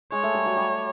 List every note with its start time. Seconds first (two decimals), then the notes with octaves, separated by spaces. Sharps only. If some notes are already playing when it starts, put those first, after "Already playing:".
0.12 G#3 C#5
0.23 A3
0.35 G3
0.46 F#3
0.57 G3